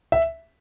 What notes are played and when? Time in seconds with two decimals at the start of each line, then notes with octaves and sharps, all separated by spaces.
0.12 E5